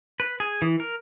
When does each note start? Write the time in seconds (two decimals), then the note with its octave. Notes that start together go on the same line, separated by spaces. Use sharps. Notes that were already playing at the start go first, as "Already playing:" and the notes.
0.20 B4
0.40 G#4
0.62 E3
0.80 A#4